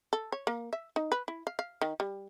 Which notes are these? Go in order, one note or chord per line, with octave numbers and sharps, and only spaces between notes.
A4
C#5
A#3
E5
D#4
B4
E4
F5
F5
D#3
G3